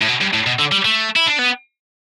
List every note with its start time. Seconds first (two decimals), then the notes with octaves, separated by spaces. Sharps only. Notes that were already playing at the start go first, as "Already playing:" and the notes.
0.02 A2
0.08 B2
0.21 G2
0.34 A2
0.46 B2
0.59 D3
0.72 G3
0.85 A3
1.16 E4
1.27 D4
1.39 B3